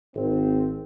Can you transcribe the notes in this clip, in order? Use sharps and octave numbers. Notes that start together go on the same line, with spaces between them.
G#1 C4